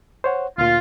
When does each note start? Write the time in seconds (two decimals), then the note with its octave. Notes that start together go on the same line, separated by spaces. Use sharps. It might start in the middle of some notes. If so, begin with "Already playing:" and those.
0.24 C5 C#5 F#5
0.58 D2 A#2 F4